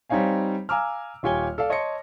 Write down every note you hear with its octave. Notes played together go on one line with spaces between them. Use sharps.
G3 C4 D#4 C#5 F5 G#5
F5 G#5 A#5 D6 E6 F6
D#1 F4 G4 C#5 G#5 G7
A4 D5 F5
C#5 D#5 A5 C6 A#6 C#7